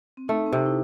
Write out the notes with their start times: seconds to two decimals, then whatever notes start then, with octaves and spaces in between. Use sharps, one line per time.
0.17 C4
0.28 A3 D#4
0.46 C4
0.52 C3 D#4
0.66 E4